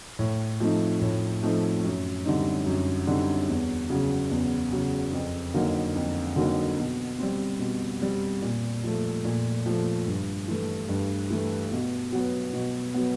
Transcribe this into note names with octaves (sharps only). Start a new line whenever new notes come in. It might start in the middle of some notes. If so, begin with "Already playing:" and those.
A2
F3 A3 C4 D#4
A2
F3 A3 C4 D#4
F#2
D3 G3 C4 D#4
F#2
D3 G3 C4 D#4
E2
C#3 F#3
E2
C#3 F#3
F2
D3 F#3 A#3 D#4
F2
D3 F#3 A#3 D#4
B2
G3 C4
B2
G3 C4
A#2
F3 A3
A#2
F3 A3
G2
E3 A3
G2
E3 A3
B2
F#3 B3
B2
F#3 B3